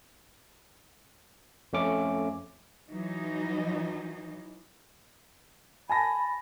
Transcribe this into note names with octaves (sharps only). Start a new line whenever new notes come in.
F2 A3 C#4 D6
E3 F#3 D#4
G#5 A5 B5 A#6